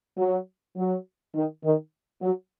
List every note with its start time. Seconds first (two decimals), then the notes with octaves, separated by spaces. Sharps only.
0.17 F#3
0.76 F#3
1.35 D#3
1.64 D#3
2.22 F#3